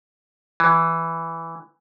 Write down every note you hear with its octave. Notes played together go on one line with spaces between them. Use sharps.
E3